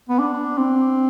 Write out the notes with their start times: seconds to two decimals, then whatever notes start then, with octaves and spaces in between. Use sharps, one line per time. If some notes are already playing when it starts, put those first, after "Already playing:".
0.09 B3
0.19 D4
0.58 C4